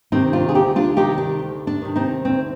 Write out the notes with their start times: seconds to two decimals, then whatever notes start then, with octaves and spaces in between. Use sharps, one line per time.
0.12 C3 D#3 C4 D#4
0.33 D4 F4
0.49 G#4
0.55 D2 D#4 G4
0.76 D4 F4
0.96 C3 D#3 D#4 G4
1.18 D4
1.39 D2
1.67 D4
1.82 C3 D#3
1.96 C4 D#4
2.25 D2 C4